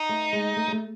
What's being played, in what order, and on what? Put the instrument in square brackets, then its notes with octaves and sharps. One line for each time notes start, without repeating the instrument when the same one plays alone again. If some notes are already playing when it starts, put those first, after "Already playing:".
Already playing: [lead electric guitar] D#4
[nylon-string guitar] A3
G#3
A3
G#3
A3